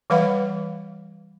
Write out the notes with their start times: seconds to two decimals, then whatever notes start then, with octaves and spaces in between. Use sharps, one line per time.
0.10 E3 G3 B4 F5 F#5 B5